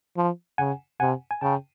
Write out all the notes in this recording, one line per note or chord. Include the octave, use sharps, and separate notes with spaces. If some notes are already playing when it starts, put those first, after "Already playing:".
F3
C#3 F#5 G#5
C3 F#5 G#5
G#5
C#3 G5 A5